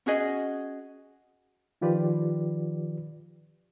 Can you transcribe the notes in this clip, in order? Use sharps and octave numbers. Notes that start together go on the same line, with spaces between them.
C#4 F#4 G#4 D#5
D#3 F3 F4 G4 B4 D5